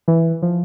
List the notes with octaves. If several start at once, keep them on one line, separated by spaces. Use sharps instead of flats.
E3
F3